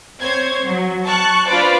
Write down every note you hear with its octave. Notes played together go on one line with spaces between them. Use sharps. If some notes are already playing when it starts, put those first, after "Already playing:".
C4 C5 C#5 G#6
F#3
A5 C#6 F#6
D4 F4 B4 C5 D5